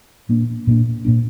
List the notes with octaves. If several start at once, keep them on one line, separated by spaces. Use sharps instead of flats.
A#2 A#3 D4
A#2 A#3 D4
A#2 A#3 D4